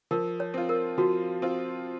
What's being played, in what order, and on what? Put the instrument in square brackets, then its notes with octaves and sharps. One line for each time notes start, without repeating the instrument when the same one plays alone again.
[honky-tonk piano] F3 [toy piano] A#4
[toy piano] C#5
[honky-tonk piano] C4 F4
[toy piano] A#4
[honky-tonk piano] F3 [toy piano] F#4
[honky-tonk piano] C4 F4